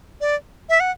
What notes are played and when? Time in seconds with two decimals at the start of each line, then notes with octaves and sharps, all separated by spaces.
0.21 D5
0.69 E5
0.80 F#5